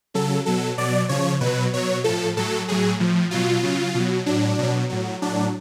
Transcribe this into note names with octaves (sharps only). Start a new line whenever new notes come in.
C#3 F#3 A4
B2 F#3 A4
B2 F#3 D5
C#3 F3 C#5
B2 F#3 B4
B2 F#3 C#5
A2 F3 A4
A2 F#3 A4
A2 F#3 G#4
A2 F3
B2 F#3 F4
C#3 F#3
B2
F#3
A2 F#3 D4
B2 F#3
A2 F#3
A2 F#3 D4